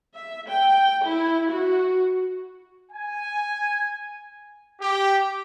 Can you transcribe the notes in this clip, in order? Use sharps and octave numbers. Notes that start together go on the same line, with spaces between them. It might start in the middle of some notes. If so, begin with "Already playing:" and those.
E5
G5
E4
F#4
G#5
G4